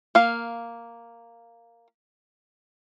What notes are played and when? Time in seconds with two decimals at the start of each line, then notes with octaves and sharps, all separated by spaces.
0.15 A#3 F5